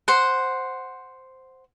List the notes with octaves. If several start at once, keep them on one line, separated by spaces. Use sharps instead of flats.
C5 F#5